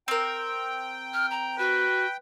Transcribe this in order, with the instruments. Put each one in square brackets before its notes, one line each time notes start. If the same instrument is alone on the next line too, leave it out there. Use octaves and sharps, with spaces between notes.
[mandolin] C4 A#4 [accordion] G5
[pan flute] F6
A#5
[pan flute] F#4 [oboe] B4